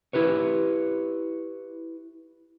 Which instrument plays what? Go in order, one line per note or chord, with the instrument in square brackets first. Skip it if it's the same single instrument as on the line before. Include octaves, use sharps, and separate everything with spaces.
[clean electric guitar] E4 G4 B4 C#5